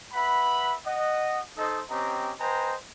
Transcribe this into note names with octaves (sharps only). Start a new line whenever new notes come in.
B4 E5 F#5 B5
D#5 F#5
D#4 A4 C5 D#5
C4 C#4 G4 D#5 A#5
B4 C5 D#5 G5 G#5 A#5